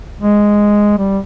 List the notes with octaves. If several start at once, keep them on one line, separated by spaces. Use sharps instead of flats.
G#3
G3